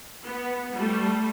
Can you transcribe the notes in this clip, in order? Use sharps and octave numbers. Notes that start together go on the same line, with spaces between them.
B3
G3 A3